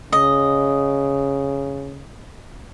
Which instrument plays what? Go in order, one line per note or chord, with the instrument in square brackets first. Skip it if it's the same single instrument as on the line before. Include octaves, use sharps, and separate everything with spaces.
[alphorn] C#3 [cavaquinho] D#5